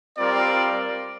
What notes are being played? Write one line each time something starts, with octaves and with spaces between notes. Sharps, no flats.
G3 C4 F4 A#4 D5